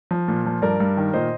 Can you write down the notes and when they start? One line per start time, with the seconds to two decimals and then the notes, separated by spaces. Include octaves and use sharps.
0.11 F3
0.28 A#2
0.46 F3
0.62 G2 A#4 D5
0.80 G2
0.97 D#3
1.13 A#2 C5 D#5